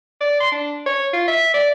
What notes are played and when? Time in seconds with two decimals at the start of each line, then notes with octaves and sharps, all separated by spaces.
0.21 D5
0.41 C6
0.52 D4
0.86 C#5
1.13 F4
1.28 E5
1.54 D5